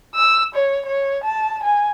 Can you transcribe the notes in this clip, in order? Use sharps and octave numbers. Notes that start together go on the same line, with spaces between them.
E6
C#5
C#5
A5
G#5